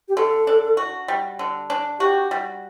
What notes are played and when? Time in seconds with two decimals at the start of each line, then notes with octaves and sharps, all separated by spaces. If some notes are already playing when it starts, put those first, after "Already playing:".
0.08 G4
0.17 D3 A4
0.47 D4
0.77 F#4
1.08 G3
1.39 D3
1.70 D4
2.00 F#4 G4
2.31 G3